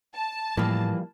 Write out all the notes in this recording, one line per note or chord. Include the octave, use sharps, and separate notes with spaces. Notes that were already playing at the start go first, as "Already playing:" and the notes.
A5
A2 E3 F3 G3 A#3